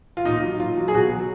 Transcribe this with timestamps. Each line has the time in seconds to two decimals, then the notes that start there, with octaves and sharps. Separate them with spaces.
0.17 F4
0.25 A#2 D#4
0.42 F#3
0.60 A#2 F4
0.77 F#3
0.88 G#4
0.94 B2 F#4
1.12 F#3